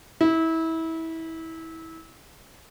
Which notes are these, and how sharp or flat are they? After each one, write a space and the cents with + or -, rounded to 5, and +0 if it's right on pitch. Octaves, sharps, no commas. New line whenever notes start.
E4 -25